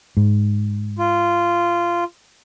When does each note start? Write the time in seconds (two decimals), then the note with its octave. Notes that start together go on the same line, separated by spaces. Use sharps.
0.17 G#2
0.99 F4